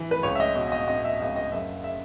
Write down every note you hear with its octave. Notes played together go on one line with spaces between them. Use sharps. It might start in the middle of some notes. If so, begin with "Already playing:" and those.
Already playing: E3
B4
C#2 C#5
E5
D#5
B2
D#5
B2 D#5
E5
C#2 E5
D#5
F#1 E5
E5